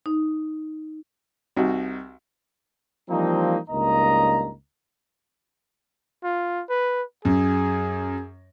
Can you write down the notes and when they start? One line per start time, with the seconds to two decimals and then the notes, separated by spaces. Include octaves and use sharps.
0.06 D#4
1.57 C2 D#4 F#4
3.09 E3 F3 G3 A#3 C4 D#4
3.70 C#2 G2 A#3 D#4 D#5 A#5
6.24 F4
6.70 B4
7.25 F#2 G#4